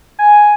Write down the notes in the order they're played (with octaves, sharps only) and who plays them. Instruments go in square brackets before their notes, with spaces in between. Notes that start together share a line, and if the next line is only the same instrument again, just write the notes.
[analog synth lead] G#5